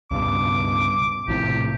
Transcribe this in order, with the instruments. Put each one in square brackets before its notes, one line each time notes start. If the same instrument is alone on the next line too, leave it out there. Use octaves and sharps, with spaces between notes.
[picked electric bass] C#2 G2 B2 [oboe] D6
[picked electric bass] A#1 A2 C3 [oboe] G4